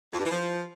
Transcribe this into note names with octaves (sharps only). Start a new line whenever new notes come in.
F2
G2
E3
F3